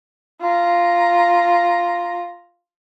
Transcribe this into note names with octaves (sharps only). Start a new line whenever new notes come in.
F4 A#5